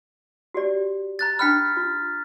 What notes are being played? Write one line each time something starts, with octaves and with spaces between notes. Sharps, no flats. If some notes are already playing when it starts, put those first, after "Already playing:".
F#4 G4 D5
A#5 F#6 A6
D4 G5 B5 F6 F#6 B6
F4